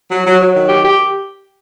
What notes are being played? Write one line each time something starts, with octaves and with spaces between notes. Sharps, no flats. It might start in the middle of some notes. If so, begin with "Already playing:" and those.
F#3
F#3
F#3
D#3
G4
G4